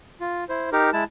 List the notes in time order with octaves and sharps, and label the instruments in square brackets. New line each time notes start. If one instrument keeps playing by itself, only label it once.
[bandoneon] F4
E4 C5
D#4 G4 A#4
G#3 E4 A5